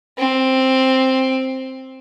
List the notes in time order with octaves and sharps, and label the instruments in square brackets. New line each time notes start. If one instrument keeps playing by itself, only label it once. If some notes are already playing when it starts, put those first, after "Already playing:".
[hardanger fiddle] C4